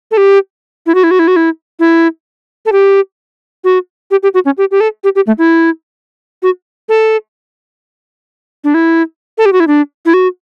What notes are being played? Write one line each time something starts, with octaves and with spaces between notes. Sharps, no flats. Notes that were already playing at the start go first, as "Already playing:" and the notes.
A4
G4
E4
F#4
E4
F#4
E4
F#4
E4
E4
A4
G4
F#4
G4
G4
F#4
C#4
G4
G4
A4
G4
G4
A3
E4
F#4
A4
D4
E4
A4
G4
F#4
E4
D4
E4
F#4